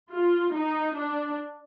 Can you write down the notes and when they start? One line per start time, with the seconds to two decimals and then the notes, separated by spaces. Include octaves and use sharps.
0.11 F4
0.54 D#4
0.95 D4